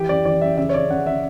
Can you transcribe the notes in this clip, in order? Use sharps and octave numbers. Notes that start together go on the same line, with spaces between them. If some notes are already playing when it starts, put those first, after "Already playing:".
Already playing: E3 G4
F#2 D5
E3 D5
F#2 E5
C#3 E5
C#5
C#3 D5
C#3 F#5
C#3 E5